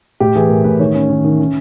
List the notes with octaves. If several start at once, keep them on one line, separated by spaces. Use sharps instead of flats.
A2 G4
E3 G#4
A2 A#4
A2 B4
D#3 C#5
C#4
D#3
D#3
C#4